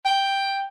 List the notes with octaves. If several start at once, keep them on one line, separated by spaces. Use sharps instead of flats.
G5